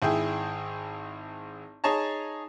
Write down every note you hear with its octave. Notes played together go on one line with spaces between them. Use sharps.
G#1 E4 G#4 G5
D#4 G#4 C#5 A5 A#5